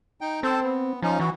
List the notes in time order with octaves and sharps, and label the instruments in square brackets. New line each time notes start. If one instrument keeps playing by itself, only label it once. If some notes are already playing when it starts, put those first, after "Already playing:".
[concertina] D#4 G5
[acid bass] C4 [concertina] A4 C5 A5
[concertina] B3
[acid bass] F3 [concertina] C#4 D#4
[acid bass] E3 [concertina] F#4